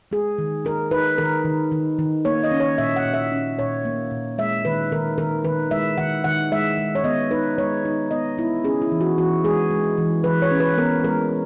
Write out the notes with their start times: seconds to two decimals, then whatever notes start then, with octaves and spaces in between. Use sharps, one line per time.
0.11 G#3 G#4
0.38 D#3
0.65 D#4 A#4
0.91 D#4 B4
1.18 D#3 A#4
1.45 D#3
1.72 D#3
1.99 D#3
2.25 A#3 C#5
2.44 D#5
2.52 C#4
2.60 C#5
2.78 A#2 E5
2.96 F#5
3.05 A#2
3.14 E5
3.32 C#4
3.59 A#2 C#5
3.85 A#3
4.11 A#2
4.38 G#3 E5
4.65 D#3 B4
4.92 D#3 A#4
5.18 D#3 A#4
5.44 D#3 B4
5.71 G#3 E5
5.98 D#3 F#5
6.24 D#3 F#5
6.52 G#3 E5
6.78 G#3
6.95 C#5
7.04 B3 D#5
7.31 D#4 B4
7.58 G#3 C#5
7.85 D#4
8.11 B3 D#5
8.37 B3 E4
8.64 C#4 G#4
8.82 E4
8.92 E3
9.01 F#4
9.18 E3 F#4
9.44 G#3 G#4
9.71 G#3
9.98 E3
10.24 E3 B4
10.42 C#5
10.51 C#4
10.60 B4
10.78 B3 A#4
11.04 G#3 A#4